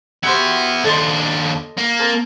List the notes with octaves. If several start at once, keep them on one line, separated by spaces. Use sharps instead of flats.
B3 E4 F#4 G4 C5
D#2 D4 A4 D#5 C6
A#3
C4 A#4 A5